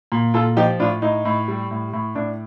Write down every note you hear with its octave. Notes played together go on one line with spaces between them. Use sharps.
A#2
A#2 F4 A4
F3 D#4 G4
A2 D4 F4
A2 D#4
A2
G3
A2
A2
A2 D4